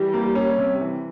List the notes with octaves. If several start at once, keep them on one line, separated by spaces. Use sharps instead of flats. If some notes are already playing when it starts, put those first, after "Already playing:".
Already playing: E3 G3
A#3
C#4
C3
E3